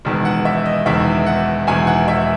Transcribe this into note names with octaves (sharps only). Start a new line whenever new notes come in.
E1 E2 D#3
F#5
E5
D#5
E1 E2 D#3 E5
F#5
E1 E2 D#3 G#5
F#5
E5